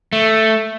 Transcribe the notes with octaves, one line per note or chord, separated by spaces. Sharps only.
A3